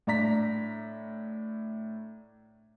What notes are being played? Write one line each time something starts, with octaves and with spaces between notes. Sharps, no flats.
A2 D4 A#5 B6